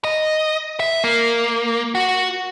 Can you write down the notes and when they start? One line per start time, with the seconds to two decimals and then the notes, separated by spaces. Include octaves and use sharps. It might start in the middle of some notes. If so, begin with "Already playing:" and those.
0.04 D#5
0.80 E5
1.04 A#3
1.95 F#4